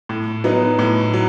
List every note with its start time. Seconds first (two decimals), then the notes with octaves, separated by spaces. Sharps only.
0.09 A2
0.44 F#3 B3 D#4
0.79 A2
1.14 F#3